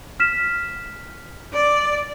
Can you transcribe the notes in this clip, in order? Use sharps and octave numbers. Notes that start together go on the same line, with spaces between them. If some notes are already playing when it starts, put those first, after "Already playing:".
F6 B6 E7
D5